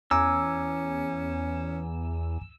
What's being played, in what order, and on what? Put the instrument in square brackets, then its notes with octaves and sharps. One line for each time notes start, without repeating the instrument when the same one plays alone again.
[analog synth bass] E2 [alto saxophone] C#4 [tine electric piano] G#5 A#5 D6 [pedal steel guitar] E6